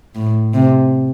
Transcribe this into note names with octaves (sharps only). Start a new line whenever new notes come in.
A2
C3